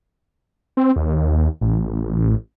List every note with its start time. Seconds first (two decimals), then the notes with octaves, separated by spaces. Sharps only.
0.77 C4
0.96 D#2
1.61 A1